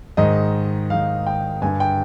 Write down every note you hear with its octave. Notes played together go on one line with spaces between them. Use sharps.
G#2 D#3 D#5
G#2 D#3 F5
G5
G2 D3 G#5
G5